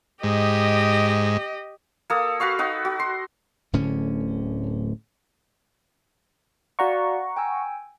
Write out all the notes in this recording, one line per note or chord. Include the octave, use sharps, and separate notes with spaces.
G#2 G4 D#5
A#3 A4 D#6
F#4 B4 F5 C#6
D#4 F#4 B4
F#4
C6
D1 A2 D3 C#4
F#4 D5 F5 F#5 A#5 C#6
G5 G#5 E6